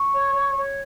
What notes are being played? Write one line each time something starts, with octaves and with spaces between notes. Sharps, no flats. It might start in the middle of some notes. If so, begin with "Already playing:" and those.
Already playing: C#6
C#5
C#5
C#5